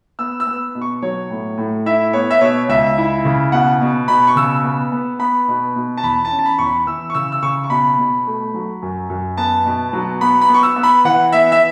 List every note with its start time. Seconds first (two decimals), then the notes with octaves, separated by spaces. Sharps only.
0.19 B3 E6
0.40 E6
0.47 B3
0.75 B2
0.81 C#6
1.02 F#3 C#5
1.30 A2
1.58 A2
1.86 E4 E5
2.13 B3 C#5
2.30 E5
2.41 B2 C#5
2.69 C#2 E5
2.98 E4
3.25 C#3
3.52 B2 F#5
3.81 B2
4.08 B2 B5
4.27 C#6
4.36 C#3 E6
4.64 B3
4.92 B3
5.19 B3 B5
5.48 B2
5.76 B2
5.97 A5
6.03 E2 B5
6.25 A5
6.31 C#4
6.39 A5
6.45 B5
6.59 E2 C#6
6.66 B5
6.86 E3 E6
7.10 C#6
7.14 C#3 E6
7.32 E6
7.42 C#3 C#6
7.64 C#6
7.70 B2 B5
7.98 B2
8.26 A3
8.54 F#3
8.82 F#2
9.10 F#2
9.37 B3 A5
9.65 B2
9.93 F#3
10.21 B3 B5
10.41 B5
10.49 B3
10.54 C#6
10.63 E6
10.76 B3
10.83 B5
11.05 E3 F#5
11.32 B3 E5
11.52 E5